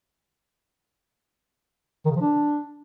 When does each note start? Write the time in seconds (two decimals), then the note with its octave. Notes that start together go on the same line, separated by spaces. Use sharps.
2.06 D#3
2.11 C#3
2.16 F3
2.21 D4